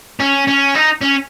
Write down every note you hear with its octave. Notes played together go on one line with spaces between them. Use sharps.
C#4
C#4
D#4
C#4